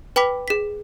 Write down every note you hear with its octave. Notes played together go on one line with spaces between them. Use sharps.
B4 G5 B5 D6 B6
G#4 B6